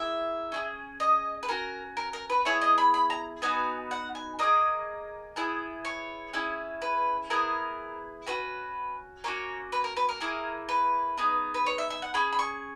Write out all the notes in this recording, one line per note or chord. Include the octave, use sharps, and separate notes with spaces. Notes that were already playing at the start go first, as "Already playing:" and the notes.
Already playing: A#3 E4 G#4 E5
C#4 E4 G#4
D#5
B4
C#4 F#4 A#4
A#4
A#4
B4
B3 E4 G#4 C#5
D#5
B5
B5
A#5
B3 D#4 F#4 G#5
F#5
G#5
A#3 D#4 G#4 D#5
B3 E4 G#4
C#5
C#4 E4 G#4
B4
B3 E4 G#4 A#4
C#4 F#4 B4
A#3 C#4 F#4 C#5
B4
A#4
B4
A#4
A#3 E4 G#4
B4
B3 D#4 G#4
B4
C#5
E5
E5
F#5
C#4 G#4 B5
B5
C#6